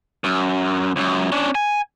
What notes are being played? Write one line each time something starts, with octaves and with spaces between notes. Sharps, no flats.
F#2
C#2 F#2
C#4 D4
G#5